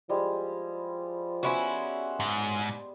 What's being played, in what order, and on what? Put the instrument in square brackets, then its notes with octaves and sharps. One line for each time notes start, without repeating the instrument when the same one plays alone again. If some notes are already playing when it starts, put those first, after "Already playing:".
[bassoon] F3 [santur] G3 G#3
[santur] B3 C5 E6 [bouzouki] C#4 E4 F#4
[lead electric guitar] G#2